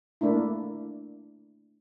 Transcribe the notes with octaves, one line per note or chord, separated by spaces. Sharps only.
A3 A#3 D4 E4